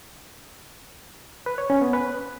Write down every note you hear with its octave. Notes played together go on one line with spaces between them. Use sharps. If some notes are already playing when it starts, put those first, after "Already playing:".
B4
C#5
C#4
B3
B4